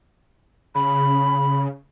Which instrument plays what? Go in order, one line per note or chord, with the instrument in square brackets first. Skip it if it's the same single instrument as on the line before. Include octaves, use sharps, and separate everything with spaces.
[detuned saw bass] C#3 [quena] B5